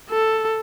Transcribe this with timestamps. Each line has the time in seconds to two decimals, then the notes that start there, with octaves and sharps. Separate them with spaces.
0.10 A4